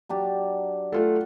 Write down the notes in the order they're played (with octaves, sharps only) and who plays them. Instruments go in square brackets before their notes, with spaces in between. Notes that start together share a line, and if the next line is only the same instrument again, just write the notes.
[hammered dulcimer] F#3 D4 G4
[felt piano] A3 F4 A4 [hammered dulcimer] F#5